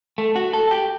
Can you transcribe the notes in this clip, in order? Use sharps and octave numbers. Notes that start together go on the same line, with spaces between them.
A3
F#4
A4
G4